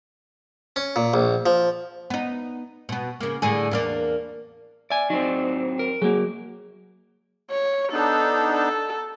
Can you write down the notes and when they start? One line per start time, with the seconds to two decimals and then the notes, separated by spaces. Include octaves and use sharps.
0.76 C#4
0.96 A#2
1.14 A#1
1.46 F3
2.10 B3 D#4
2.89 B2 B3
3.21 C#3 A#3
3.42 A2 D3 G#4
3.71 E2 A#3 D4
4.90 D5 E5 G#5
5.10 F#3 C4 D#4
5.79 A#4
6.02 F#3 A#3 F#4 G#4
7.51 C#5
7.92 B3 D4 D#4 A4
8.53 A4